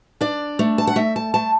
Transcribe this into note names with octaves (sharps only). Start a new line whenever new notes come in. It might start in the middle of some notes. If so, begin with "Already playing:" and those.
D4 D5
A3
A5
F#5
A3 E5
A5
A3 A5